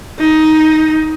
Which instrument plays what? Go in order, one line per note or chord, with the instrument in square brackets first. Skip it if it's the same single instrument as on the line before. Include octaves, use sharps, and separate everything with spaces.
[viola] D#4